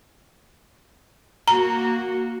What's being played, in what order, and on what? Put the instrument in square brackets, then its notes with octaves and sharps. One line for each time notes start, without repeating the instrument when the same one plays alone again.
[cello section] A#3 F#4 [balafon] A#5